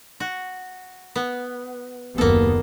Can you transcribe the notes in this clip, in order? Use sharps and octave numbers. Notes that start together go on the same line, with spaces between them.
F#4
B3
F#1 D#2 A#3 B3 A4